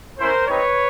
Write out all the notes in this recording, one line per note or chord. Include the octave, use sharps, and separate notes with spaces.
A3 C#4 E4 A#4 C5
G3 C4 D#4 B4 C#5